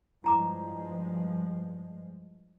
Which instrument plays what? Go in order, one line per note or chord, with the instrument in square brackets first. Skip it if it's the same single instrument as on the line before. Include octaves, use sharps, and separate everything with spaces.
[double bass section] G2 F3 G#3 [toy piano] E4 A#5 D6